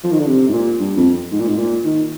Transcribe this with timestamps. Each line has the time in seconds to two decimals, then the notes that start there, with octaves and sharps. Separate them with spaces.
0.04 F3
0.12 D#3
0.20 D3
0.27 C3
0.49 G#2
0.53 A#2
0.80 G2
0.97 F2
1.32 G#2
1.40 A#2
1.48 G#2
1.58 A#2
1.84 D#3